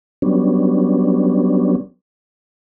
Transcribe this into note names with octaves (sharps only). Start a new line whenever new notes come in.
F#3 G3 B3 C#4 D4